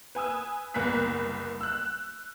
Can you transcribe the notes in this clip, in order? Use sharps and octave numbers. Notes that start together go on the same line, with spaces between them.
B4 G#5 D#6 E6
F#1 C2 B3 A#4 F#6 B6
E6 F#6